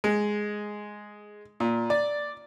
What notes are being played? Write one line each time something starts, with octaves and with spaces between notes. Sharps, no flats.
G#3
A#2
D5